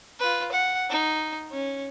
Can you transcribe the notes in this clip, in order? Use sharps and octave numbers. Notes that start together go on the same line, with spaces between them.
F4 B4
F#5
D#4
C#4